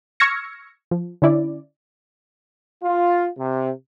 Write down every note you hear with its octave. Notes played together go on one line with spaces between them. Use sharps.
C#6 E6 F6 G#6 A#6 C#7
F3
D3 C#4 E4 D5
F4
C3